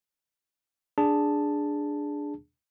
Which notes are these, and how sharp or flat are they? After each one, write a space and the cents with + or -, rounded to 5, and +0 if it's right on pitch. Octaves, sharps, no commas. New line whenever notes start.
D4 +0 G#4 +0 A5 +0